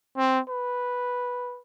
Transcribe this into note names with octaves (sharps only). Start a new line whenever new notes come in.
C4
B4